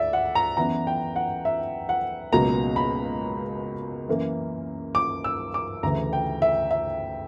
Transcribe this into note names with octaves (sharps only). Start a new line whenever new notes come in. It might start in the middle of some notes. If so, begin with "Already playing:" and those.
Already playing: D2 D5 E5
F#5
A#5
F#2 E3 B3 A#5
G5
F#5
E5
F#5
C#2 B2 F#3 A#3 A#5
B5
F#2 E3 A#3
D6
E6
D6
D2 C#3 E3 A#5
G5
E5
E5